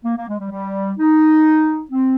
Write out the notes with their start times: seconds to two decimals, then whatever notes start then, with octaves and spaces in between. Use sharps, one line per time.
0.05 A#3
0.17 A#3
0.28 G#3
0.40 G3
0.51 G3
0.98 D#4
1.91 C4